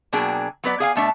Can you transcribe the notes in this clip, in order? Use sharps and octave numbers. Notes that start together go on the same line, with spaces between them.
B2 F#3 A#3 D4 G#4 G5
F#3 B3 B4 D5
G#4 F5 G#5
B2 A3 D4 E5